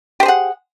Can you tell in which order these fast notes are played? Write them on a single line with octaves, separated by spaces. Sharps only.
G4 C5 G#4 F#5